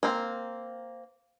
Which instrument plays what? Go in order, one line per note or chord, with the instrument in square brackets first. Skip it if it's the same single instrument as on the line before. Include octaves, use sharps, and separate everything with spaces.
[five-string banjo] A#3 C4